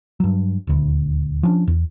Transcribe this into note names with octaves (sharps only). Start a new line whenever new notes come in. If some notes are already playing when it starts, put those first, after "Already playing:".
G2 F#3
D#1 D2
F3 C#4 D4
E2